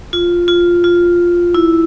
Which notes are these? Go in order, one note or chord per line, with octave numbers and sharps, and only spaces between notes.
F4
F4
F4
E4